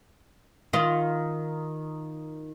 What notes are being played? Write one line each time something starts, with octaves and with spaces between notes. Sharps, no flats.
D#3 F4